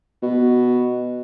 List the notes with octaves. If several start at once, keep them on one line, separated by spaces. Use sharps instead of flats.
B2